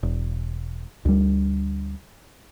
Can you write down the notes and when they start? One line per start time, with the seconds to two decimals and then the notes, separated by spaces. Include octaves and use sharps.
0.03 E1
1.05 D2 G3